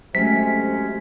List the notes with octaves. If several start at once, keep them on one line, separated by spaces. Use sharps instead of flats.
C3 F#3 G#3 A3 C#4 B6